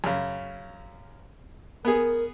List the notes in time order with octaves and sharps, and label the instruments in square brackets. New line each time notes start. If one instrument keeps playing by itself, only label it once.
[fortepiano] F#2 C#3
[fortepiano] B3 G#4 [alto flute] A#4